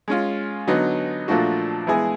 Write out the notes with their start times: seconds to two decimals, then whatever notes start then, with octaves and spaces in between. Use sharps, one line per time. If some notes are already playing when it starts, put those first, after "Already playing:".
0.08 G#3 C#4 F4
0.67 D3 F#3 B3 D#4
1.28 A#2 F3 A3 D4 F#4
1.87 E3 G#3 B3 E4 G#4